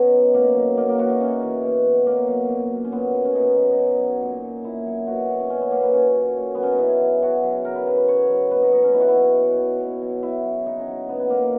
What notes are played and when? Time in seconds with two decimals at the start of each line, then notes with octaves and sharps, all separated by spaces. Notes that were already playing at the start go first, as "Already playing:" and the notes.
Already playing: B2 B3 C#4 D#4
0.13 F#3
0.34 B2 A#3
0.56 F#3
0.77 C#3 A#3
0.88 A#3
0.99 E3 F#4
1.10 D#4
1.20 C#3 C#4
1.42 E3
1.63 B2
1.85 F#3
2.06 B2 A#3
2.27 F#3
2.49 A#2
2.71 F#3
2.85 C#4
2.92 A#2 B3
3.14 F#3
3.25 C#4
3.35 B2 D#4
3.57 F#3
3.71 D#4
3.78 B2 C#4
3.99 F#3
4.21 A#2
4.43 F#3
4.64 A#2 E4
4.86 F#3
5.07 B2 F#4
5.29 F#3
5.40 C#4
5.50 B2 C#4
5.61 B3
5.71 F#3 A#3
5.83 B3
5.93 A#2 C#4
6.14 F#3
6.36 A#2
6.55 F#3 B3
6.63 C#4
6.70 D#4
6.79 C#3 E4
7.01 F#3
7.22 C#3 F#4
7.43 F#3
7.65 C#3 A#4
7.75 B4
7.86 F#3 B4
7.97 B4
8.08 C#3 C#5
8.29 F#3
8.51 B2 B4
8.62 D#4
8.73 F#3 D#4
8.84 C#4
8.94 B2 E4
9.00 F#4
9.08 E4
9.15 F#3
9.36 B2
9.58 F#3
9.80 B2
10.02 F#3
10.23 C#3 E4
10.44 F#3
10.66 C#3 D#4
10.80 C#4
10.88 F#3
11.09 C#3 B3
11.20 B3
11.30 F#3 A#3